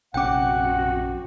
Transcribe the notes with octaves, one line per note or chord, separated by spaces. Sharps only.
A#1 F#2 C3 C#4 F#4 F#5 G5 D6